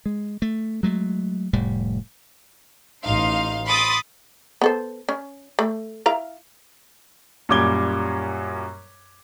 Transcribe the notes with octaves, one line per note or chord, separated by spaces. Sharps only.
G#3
A3
F#3 G#3 A3
F1 A2 G3
A1 D#4 F5 C6
B5 C6 D6 D#6 A6
B3 A4 C5
C#4
A3
E4 F5 A#5
F#2 A#2 G3 D6 G#6 G7